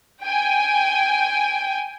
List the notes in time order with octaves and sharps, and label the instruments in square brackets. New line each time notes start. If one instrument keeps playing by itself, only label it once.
[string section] G5 G#5